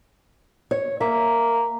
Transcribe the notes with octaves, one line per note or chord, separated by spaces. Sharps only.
C#5
A#3 E5